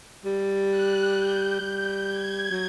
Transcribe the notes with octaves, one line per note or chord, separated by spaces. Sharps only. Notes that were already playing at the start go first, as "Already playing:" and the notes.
G3
F#6
G6
G3
G#6
F#3